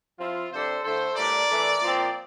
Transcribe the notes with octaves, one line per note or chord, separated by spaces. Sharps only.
F3 C4 E4 F4
C3 G3 D4 A4 C5
D3 A3 E4 A4 C5
A2 G3 D4 A#4 D5
E3 A3 D4
A#2 F3 C4